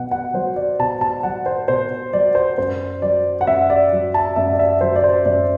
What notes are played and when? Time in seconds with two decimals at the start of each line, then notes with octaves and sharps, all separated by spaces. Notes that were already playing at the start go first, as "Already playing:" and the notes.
Already playing: B2 F#3 F#5
0.11 F#5
0.34 F#3 C5
0.56 D5
0.79 B2 A5
1.01 A5
1.23 F#3 F#5
1.46 C5
1.68 B2 C5
2.13 F#3 D5
2.35 C5
2.58 F#2 C5
3.02 F#3 D5
3.41 F#5
3.47 F#2 E5
3.70 D5
3.92 F#3
4.14 A5
4.36 F#2 E5
4.53 D5
4.59 E5
4.81 F#3 C5
4.96 D5
5.04 C5
5.25 F#2 D5